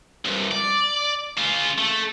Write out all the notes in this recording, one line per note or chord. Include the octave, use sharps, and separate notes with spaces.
C2 G2
D5
C#3 F4
A3